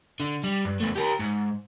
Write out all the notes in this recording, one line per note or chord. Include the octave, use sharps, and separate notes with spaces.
D3
G3
G2
E2 A3
G4 A#4
G#2